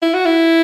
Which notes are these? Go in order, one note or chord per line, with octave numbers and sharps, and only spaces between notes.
E4
F#4
E4